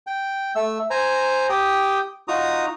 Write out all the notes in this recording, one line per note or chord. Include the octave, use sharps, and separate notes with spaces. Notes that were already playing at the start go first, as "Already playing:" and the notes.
G5
A3 E6
C5 G#5 A#5
G4 G5 D#6
D#4 F4 F#4 A#5 D#6